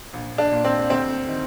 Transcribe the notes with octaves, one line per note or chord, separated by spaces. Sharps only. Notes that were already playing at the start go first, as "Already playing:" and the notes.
A#1
D4
A#2
C4
D2 C4
D#3